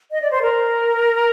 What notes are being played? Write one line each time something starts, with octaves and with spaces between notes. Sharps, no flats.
D#5
D5
C5
A#4